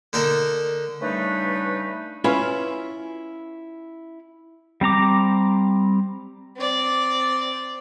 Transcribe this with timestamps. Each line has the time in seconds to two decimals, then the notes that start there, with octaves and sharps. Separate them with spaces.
0.13 D3 D#4 A4 A#4
1.01 C#3 G3 A3 D4 D#4 B4
2.24 C#4 E4 F4 B4 C#5
4.81 G3 C4 A#5 D6
6.57 C4 D5